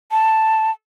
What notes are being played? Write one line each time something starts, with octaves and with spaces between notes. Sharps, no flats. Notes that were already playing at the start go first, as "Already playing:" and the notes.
A5